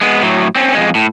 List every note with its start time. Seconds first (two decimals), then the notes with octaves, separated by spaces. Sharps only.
0.01 G#3 B3
0.23 A2 F#3
0.55 C4 C#4
0.75 F2 G#3
0.95 A2